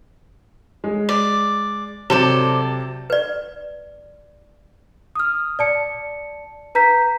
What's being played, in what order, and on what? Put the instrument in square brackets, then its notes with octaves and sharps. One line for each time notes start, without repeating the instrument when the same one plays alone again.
[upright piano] G#3
[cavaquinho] D5
[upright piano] C3 F#3 [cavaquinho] A4 C5 D5
[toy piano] B4 D5
[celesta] D#6 F6
D5 A5 C#7
B4 A#5 G6 B6